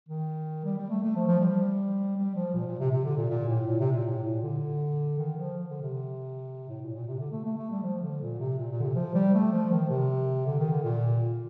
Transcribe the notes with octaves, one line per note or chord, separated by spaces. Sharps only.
D#3
G3
G3
A3
A3
F3
F3
G3
G3
F3
A#2
A#2
C3
C3
D3
A#2
A#2
A2
A#2
C3
A#2
A2
A#2
D3
D#3
F3
D3
C3
A2
A#2
A#2
C3
D3
A3
A3
A3
G3
F3
D3
A#2
C3
A#2
A#2
D3
C3
F3
G3
A3
F3
D#3
C3
D3
D#3
D3
A#2